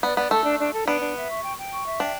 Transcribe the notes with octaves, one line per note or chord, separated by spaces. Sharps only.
B3 D5
B3 D5
A3 A4
D4
D4
A4
B3 D4
D4
E5
C#6
G5
G5
C#6
E5
D4 G5